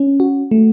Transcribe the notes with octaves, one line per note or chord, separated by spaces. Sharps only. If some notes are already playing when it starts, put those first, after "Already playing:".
Already playing: C#4
F#4
A3